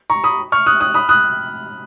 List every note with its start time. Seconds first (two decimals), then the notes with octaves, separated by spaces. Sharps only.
0.10 A#5 C#6
0.24 B5 D#6
0.52 C#6 F6
0.66 D#6 F#6
0.80 D#6 F#6
0.94 B5 D#6
1.09 D#6 F#6